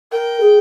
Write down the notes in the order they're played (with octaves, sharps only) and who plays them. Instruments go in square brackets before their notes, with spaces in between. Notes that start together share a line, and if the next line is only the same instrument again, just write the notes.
[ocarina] A#4 [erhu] G5
[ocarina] G#4